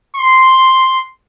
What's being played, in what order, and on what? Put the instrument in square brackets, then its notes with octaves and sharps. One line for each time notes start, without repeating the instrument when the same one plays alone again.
[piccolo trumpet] C6